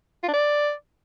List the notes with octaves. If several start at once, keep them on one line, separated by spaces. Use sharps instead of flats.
F4
D4
D5